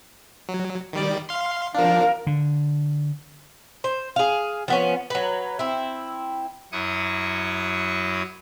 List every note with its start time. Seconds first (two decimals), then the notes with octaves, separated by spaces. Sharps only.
0.49 F#3
0.93 D#3 G3 D5
1.29 F5 C6
1.75 F3 D4 A#4 F5
2.27 D3
3.84 C5
4.16 G#4 F5
4.68 F3 B3 C#4
5.10 F#3 B4
5.59 C4 E4
6.72 F#2 F#3 E4 C#6 D#6